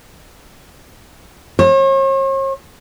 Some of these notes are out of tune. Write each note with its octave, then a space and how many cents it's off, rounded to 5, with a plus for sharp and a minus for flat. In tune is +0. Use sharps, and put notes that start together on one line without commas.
C#5 -45